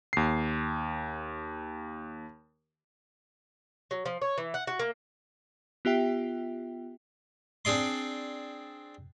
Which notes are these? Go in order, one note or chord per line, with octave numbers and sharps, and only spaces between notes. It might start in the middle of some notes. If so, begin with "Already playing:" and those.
D#2 C7
F#3
F3
C#5
E3
F#5
F#4
A#3
B3 F4 G4 E5 G5
C4 D4 G#4 D5 C6